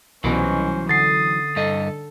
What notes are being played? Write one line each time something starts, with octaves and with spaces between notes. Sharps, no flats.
C2 B2 E3 F#3 C#4 C5
D3 D#6 A6 C7
G2 A4 D#5